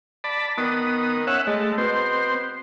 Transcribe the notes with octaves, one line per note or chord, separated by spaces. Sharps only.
D5 A5 B5
D#3 B3 D#6
C#4 E5 F#5
G#3 A3
B2 C4 C5